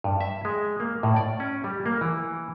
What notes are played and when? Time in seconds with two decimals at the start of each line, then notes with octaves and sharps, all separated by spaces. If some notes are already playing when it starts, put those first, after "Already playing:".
0.04 G2
0.21 E5
0.45 G#3
0.80 A#3
1.03 A2
1.16 D5
1.40 C#4
1.64 G3
1.86 A#3
2.01 E3